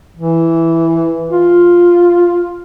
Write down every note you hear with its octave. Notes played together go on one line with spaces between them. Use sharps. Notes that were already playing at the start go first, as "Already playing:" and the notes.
E3
F4